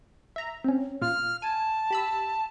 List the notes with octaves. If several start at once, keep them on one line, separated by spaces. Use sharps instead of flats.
E5 A#5
C4 C#4
A#2 F4 F6
G#5 A5
G4 B5 E6